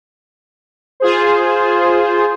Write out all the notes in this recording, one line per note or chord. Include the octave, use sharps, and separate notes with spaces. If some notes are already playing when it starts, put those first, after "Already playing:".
F4 G#4 C5